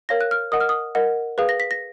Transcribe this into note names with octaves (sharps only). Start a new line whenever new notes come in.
A#4 C#5 F5 A#6
F#6
F6
A#4 D#5 F#5 D#6
F6
D#6
A#4 D#5 F#5
G#4 B4 F5
A#6
B6
A#6